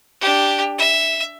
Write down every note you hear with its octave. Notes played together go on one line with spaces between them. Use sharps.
D4 G4
E5